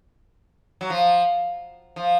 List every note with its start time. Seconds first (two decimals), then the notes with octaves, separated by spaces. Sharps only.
0.81 F#3
0.90 F3
1.96 F3